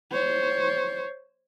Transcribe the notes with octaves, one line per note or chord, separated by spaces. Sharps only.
C5 C#5